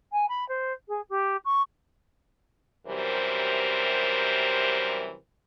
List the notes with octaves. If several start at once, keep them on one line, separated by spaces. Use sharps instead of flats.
G#5
B5
C5
G#4
G4
C#6
F#2 C3 E3 G3 A#4 C5